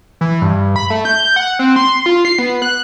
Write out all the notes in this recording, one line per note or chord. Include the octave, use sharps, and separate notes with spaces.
E3
G2
B5
A3
G6
F#5
C4
C6
F4
C7
B3
F#6